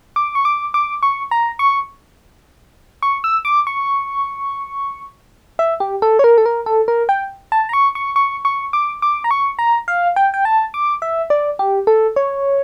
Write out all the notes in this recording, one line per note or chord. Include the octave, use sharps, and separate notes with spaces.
D6
C#6
D6
D6
C#6
A#5
C#6
C#6
E6
D6
C#6
E5
G4
A4
C#5
A#4
A4
A#4
A4
A#4
G5
A5
A#5
C#6
C#6
C#6
C#6
D6
D6
A#5
C#6
A#5
F5
G5
G5
A5
D6
E5
D5
G4
A4
C#5